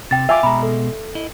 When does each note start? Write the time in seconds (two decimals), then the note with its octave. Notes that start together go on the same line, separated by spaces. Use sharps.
0.11 C3 G5 A6
0.29 F4 E5 G#5 D6
0.43 B2 G#3 A#5 B5
0.63 A4
1.15 E4 D#5